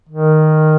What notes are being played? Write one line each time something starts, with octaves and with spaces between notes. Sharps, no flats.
D#3